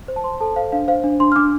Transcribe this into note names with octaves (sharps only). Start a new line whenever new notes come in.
C5
A5
C5 C6
A4 A5
C5 F5
D4 F5
C5 F5
D4
D4 C6
F6
D4 D6